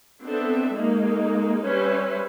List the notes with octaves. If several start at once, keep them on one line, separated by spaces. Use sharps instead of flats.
B3 C4 D4 A4 E5
G#3 A#3 D#4
G3 C#4 B4 C5 E5